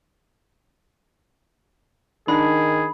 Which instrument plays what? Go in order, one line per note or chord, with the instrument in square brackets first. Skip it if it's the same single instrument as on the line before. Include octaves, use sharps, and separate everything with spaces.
[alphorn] D#3 [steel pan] D4 D#4 [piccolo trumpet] G#4 [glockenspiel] B5